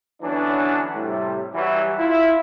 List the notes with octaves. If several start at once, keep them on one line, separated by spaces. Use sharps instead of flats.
D3 E3 F#3 B3 C#4 D4
A2 C3 G3
E3 F#3 G3
E4 F4